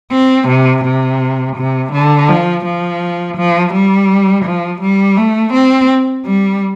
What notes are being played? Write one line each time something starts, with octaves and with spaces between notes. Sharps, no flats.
C4
C3
C3
C3
D3
F3
F3
F3
G3
F3
G3
A3
C4
G3